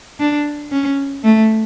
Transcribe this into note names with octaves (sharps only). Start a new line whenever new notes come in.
D4
C#4
A3